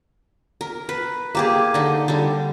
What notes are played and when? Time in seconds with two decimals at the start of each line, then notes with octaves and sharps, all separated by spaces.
0.61 A#4
0.89 B4
1.35 A#3 G4 G#4
1.74 D3 D#4
2.08 D3 G3